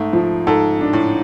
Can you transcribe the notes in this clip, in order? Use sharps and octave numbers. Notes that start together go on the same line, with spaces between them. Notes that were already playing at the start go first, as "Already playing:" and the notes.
Already playing: G#2 A3
F3
G#2 A4
D4
A2